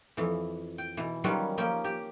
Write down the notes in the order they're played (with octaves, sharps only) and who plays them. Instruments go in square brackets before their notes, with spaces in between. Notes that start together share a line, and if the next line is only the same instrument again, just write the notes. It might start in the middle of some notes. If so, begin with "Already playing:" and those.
[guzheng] F2 E3
G5
B2 E3
D#3 F#3 G3 C#4 F4 B4
F3 A#3 C#4 G5
G4